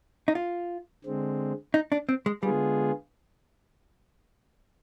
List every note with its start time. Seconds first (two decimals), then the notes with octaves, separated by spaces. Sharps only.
0.28 D#4
0.35 F4
1.04 D3 G#3 C4
1.74 D#4
1.92 D4
2.09 C4
2.26 G#3
2.43 D3 G3 G#3 B3 F4 G#4